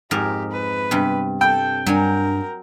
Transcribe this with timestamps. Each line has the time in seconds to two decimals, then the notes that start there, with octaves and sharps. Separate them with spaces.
0.11 F2 G#2 G4 A#4
0.51 B4
0.91 G2 C3 G3 B3
1.41 A4 G5
1.86 G2 F#3 D4 A#4 G#5